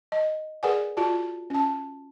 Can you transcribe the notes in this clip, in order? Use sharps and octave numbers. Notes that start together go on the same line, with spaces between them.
D#5
G#4 A#4 B4 D5 F#5 G#5
F4 F#4 D5 A5
C#4 A5